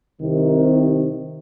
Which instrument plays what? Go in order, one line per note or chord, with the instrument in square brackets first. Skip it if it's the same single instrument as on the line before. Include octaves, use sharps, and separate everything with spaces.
[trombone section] C2 C3 D#3